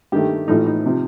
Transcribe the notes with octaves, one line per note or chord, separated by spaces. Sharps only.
G2 D#3 A3 G4
A1 A2 F3 A3 D#4
D#4
C3 F3